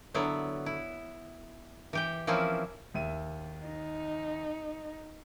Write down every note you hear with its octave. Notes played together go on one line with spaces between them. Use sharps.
D3 F#3 B3 E4
E4
E3 G4 G5
E3 F3 A#3 C4 C#4 E4
D#2 E5 D#7
D#4